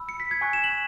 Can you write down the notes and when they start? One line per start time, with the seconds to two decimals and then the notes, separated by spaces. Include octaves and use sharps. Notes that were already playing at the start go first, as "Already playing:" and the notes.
Already playing: B5 E6
0.09 C#7
0.20 B6
0.31 G#6
0.41 G#5 C#6 F#6
0.53 E7
0.64 F#7